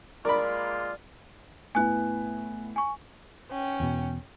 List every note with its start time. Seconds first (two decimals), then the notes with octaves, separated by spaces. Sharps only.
0.25 G#3 A#3 F4 A#4 D5 B5
1.75 A2 B3 E4 G#5 F#6
2.76 G#5 C#6
3.50 C#4 G5
3.80 E2 B2